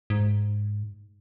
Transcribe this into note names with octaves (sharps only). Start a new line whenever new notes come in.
G#2